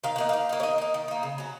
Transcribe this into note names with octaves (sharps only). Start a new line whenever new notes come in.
D#3 F5
A#3 D#4 F#5
D#3 F5
A#3 D#4
C#5
D#3 D#5
A#3 D#4
D#3
A#3 D#4
C#3
F#3 C#4